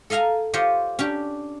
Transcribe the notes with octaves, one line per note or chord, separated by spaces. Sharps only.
A4 D#5 F5 G#5 A#5
F4 G4 C5 C#5 D#5
C#4 D4 G4